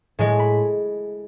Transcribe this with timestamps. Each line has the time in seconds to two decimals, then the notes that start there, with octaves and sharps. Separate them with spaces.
0.19 A2 G#3 G#5
0.39 B5